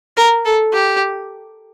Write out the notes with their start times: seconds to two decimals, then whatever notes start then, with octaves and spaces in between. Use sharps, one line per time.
0.17 A#4
0.45 A4
0.73 G4